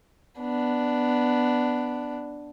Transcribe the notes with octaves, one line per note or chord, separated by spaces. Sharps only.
B3 D4